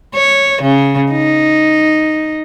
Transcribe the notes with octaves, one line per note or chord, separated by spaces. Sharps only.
C#5
C#3
D#4